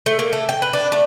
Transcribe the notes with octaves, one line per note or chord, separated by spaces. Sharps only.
A3
A#3
A3
G5
B4
D4
A3